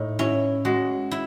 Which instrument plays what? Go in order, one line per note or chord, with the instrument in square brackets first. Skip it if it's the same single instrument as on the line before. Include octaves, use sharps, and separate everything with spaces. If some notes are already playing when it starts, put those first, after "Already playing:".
Already playing: [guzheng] A2 [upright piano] D#4
[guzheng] C#4 [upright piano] E4
[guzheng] G#3 [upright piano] F#4
[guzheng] E4